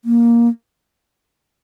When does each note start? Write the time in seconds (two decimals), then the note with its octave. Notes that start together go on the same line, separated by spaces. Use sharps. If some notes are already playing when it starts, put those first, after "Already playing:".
0.05 A#3